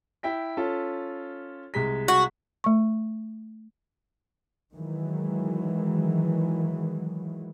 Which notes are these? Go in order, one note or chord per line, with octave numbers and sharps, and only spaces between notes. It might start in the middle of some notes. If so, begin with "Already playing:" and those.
E4 G5 B6
C#4 F4 A4
C2 G#3 B6
F#4
A3 C#6
D#3 E3 F#3 G#3